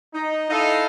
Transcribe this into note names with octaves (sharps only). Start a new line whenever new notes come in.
D#4
D#4 E4 A4 D#5 F5 A5